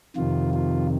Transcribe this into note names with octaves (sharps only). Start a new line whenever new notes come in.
F2 C3 D#3 F4
F4